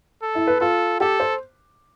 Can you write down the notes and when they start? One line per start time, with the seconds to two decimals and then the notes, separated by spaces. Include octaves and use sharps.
0.22 A4
0.35 E4
0.47 B4
0.60 F4 A4
1.00 G4 A4
1.20 C5